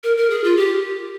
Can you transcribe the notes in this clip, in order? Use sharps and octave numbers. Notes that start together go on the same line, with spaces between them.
A#4
A#4
G#4
F4
G4